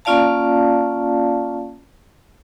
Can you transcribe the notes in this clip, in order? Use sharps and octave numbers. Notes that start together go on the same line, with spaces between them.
A#3 C#4 F4 D5 F5 A5